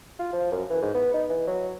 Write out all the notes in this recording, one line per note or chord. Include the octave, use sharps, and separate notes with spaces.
F4
F3
F#2
E3
G#2
B3
D#4
E3
F#3